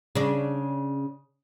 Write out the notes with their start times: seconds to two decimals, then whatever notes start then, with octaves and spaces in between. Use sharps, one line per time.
0.15 C#3 D4